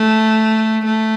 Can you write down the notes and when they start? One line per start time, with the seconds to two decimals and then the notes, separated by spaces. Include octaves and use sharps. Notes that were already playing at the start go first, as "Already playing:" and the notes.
Already playing: A3
0.85 A3